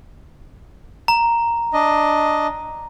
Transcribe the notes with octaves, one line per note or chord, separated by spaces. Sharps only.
A#5
D4 D#5